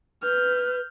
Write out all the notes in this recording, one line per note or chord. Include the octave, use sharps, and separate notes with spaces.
B4 F6 G6